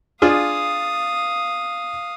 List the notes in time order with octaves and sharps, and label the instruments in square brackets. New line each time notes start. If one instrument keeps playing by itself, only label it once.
[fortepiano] D4 F4 G#4 [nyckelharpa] F5 D#6